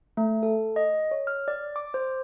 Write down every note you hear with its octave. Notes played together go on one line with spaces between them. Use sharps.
A3
A4
D#5
C#5
F6
D5
D6
C5